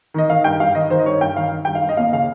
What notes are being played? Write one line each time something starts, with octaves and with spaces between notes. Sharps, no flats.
D#3 D#5
D#3 F5
G2 G5
G2 F5
D#3 D#5
D#3 C5
D#5
G2 C#5
G2 G5
D#3 F5
D#3
G2 G5
F5
G2
D#5
D#2 F5
C#3 F5